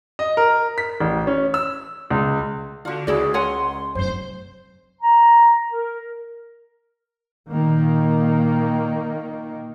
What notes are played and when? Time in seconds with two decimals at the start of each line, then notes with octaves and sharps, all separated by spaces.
0.19 D#5
0.37 A#4
0.78 B6
1.00 A1
1.27 C#4
1.54 E6
2.10 C#2
2.85 D3 F4 F#4
3.07 C#2 E4 F#4 G#4 D5
3.34 C#5 F#5 G#5 C6
3.95 F1 F#2 C5
5.02 A#5
5.72 A#4
7.52 A#2 D#3 A#3